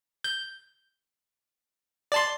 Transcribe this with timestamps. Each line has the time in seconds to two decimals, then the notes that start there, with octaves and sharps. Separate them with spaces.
0.24 G6
2.12 D5 A5 C6